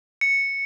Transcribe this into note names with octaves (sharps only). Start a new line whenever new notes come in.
C#7